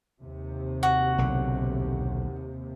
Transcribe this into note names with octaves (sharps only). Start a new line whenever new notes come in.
D#2 C3
F#4
B1 D3